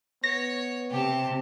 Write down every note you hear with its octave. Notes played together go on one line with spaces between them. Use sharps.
B3 C#5 A#6
C3 G4 A5